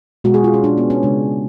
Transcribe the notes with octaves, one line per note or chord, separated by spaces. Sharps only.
B2 G#3 F#4
G#4
F4
C#4
D4
B3
C#4
C#3 G#3 D4